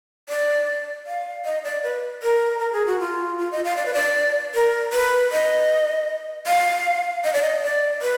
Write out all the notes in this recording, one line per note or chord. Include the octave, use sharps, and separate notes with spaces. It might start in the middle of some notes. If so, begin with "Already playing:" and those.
D5
F5
D#5
D5
B4
A#4
A#4
G#4
F#4
F4
F4
D#5
F5
D5
B4
D5
A#4
B4
D#5
F5
D#5
D5
D#5
D5
B4